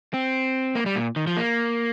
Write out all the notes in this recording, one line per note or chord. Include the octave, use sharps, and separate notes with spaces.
C4
A#3
G3
A#2
D#3
F3
A#3